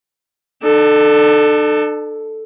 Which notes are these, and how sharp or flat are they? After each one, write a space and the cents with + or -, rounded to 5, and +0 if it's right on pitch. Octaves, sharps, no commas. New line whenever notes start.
D4 +40 A4 +0